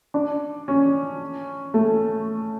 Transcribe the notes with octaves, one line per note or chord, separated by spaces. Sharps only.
D4
C#4
A3